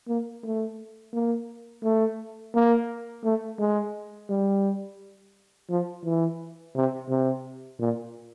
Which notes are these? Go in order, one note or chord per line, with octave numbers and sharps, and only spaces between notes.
A#3
A3
A#3
A3
A#3
A3
G#3
G3
F3
E3
C3
C3
A#2